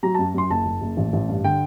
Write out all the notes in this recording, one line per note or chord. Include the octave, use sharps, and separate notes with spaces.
F#3 A#5
F#2 A5
F#2 C6
F#1 A5
F#1
F#1
A1
A1
G2
D3 G5